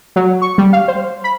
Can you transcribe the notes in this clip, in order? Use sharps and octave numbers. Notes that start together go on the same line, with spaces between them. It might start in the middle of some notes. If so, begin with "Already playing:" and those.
F#3
C#6
G3
F5
C5
B5